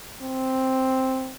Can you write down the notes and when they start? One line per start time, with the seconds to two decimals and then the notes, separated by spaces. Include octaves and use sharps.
0.22 C4